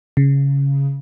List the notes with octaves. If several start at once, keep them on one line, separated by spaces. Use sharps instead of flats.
C#3